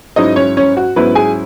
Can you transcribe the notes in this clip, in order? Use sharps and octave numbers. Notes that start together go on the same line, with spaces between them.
G#2 F#3 C#4 D#4 E4 D#5
C#4 C#5
C#4 C#5
F#4
G#2 F#3 B3 C#4 E4 B4
G#4 G#5